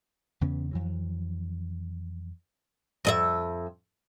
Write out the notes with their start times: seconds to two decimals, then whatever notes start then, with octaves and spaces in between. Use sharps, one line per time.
0.41 E2 C#3 B3 C#4
0.71 F2 E3 F#3
3.05 F2 D#5 E5